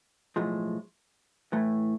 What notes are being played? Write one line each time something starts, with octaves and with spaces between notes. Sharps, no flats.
B1 A2 F3 G#3
A2 E3 A3